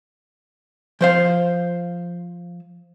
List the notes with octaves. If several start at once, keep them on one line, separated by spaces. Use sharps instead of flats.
F3 C5 F5